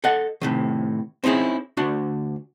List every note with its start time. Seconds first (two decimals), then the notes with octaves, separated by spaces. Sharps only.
0.04 A4 D#5 F#5
0.41 A2 C3 D#3
1.24 C4 C#4 D#4 E4 G#4
1.77 D2 D4 F#4